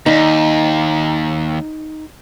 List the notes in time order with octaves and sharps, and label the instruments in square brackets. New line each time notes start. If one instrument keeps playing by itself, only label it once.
[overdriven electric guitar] D#2 [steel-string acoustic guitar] D#4